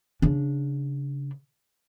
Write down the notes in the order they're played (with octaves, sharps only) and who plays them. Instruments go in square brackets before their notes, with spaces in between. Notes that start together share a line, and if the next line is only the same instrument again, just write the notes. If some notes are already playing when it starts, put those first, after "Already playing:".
[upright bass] C#3 D4